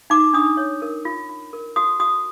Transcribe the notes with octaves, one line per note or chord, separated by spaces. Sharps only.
D#4 D6
D4 D#6
C#5
A#4
F4
F4
A#4
F#4 D#6
F#4 D#6